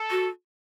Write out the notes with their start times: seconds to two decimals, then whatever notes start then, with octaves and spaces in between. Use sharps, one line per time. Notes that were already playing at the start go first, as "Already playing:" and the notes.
Already playing: A4
0.11 F#4